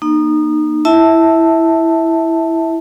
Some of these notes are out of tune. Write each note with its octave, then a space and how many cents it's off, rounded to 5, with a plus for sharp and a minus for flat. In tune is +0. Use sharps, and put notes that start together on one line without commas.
A#3 +15 D#4 -30
E4 +0 E5 -20 A5 +5